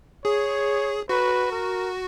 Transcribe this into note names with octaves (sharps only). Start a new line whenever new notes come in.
G#4 C#5
F#4 B4
A#4